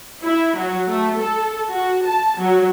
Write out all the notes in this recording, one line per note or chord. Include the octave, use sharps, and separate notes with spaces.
E4
F#3
A3
A4
F#4
A5
F#3